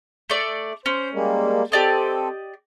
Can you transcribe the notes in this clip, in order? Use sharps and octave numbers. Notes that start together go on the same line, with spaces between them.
A3 D5
C#4 C5
G3 G#3 A#3
C4 G4 A4 D5 D#5